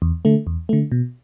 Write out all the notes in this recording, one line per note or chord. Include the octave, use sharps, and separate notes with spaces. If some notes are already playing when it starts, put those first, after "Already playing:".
E2
D3 A3
E2
D3 A3
B2